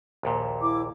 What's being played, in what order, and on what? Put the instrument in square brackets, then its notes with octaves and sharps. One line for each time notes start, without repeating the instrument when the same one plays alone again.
[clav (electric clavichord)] A#1 D#2 A#2
[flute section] E4 D6